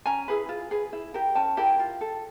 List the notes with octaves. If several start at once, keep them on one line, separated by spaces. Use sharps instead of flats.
C#4 G#5 A#5
E4 G#4 B4
F4
G#4 B4
E4
G4 A#4
C#4 G5 A5
E4 G4 A#4
F4
A4